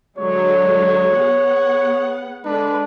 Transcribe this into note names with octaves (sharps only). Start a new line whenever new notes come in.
D3 F#3 G#3 C#5
B3 G#4 F#5
D3 G#3 D4 B4